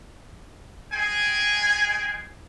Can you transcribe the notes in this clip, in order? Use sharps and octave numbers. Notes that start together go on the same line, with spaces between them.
G#3 G#4 G5 G#5